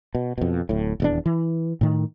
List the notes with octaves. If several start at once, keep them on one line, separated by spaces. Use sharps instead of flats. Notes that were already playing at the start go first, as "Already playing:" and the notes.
B2
F2 B2
D1 A2
D#1 E2 D4
E3
A2 D#3